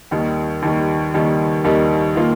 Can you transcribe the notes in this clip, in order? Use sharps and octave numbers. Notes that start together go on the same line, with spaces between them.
D#2 D#3 G3
D#2 D#3 G3
D#2 D#3 G3
D#2 D#3 G3
D#3 A#3 F4